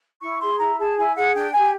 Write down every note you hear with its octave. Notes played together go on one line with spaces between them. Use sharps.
E4 C#6
G#4 C6
E4 A#5
G#4 A5
E4 G#5
G#4 F#5
D4 G5
G4 G#5